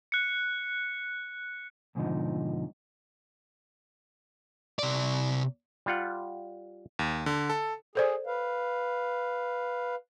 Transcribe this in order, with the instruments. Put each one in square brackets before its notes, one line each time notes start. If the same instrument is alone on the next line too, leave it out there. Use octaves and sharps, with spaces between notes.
[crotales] F#6 C#7
[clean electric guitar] F2 G#2 B2 D3 F3 D#4
[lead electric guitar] C3 D5
[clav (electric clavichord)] G3 F4 F#5
[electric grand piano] D#2
D3
A4
[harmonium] G#4 [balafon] A4 C5 D5
[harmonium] B4 F5